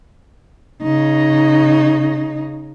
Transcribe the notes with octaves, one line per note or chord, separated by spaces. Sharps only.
C#3 D#4